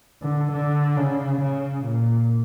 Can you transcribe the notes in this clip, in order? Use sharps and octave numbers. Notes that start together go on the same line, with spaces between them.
D3
D3
C#3
C#3
A#2